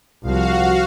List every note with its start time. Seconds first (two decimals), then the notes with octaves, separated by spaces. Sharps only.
0.23 C2 F3 F#4 F5